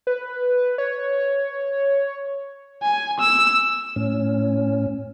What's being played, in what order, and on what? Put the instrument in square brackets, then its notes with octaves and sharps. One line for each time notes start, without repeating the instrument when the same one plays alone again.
[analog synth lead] B4
C#5
[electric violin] G#5
E6
[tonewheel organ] A2 C#4